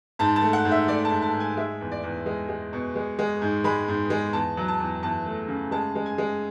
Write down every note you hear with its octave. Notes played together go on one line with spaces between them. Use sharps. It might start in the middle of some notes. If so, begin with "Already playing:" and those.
G#2 A5
A5
A3
F#5
G#2
E5
A3 D5
A5
G#2
A5
G#2
G#5
G#3 E5
E2
D5
E2
G#3
G#3
B2
G#3
G#3
G#2
G#3 B5
G#2
G#3
E2 A5
F#3
A5
E2
E2 A5
A3
C#3
G#3 A5
G#3
G#5
G#3